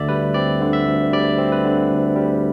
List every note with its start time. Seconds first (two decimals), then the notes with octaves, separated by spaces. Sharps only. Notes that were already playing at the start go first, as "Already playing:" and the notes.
Already playing: D2 D3 D5 E5
0.09 G3 B4
0.34 C4 D5
0.61 D3
0.73 E5
0.87 D2
1.13 G3 D5
1.38 C4
1.52 B4
1.64 D3
1.91 D2
2.16 G3